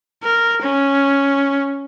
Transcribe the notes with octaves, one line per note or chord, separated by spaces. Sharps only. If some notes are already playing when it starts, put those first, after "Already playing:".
A#4
C#4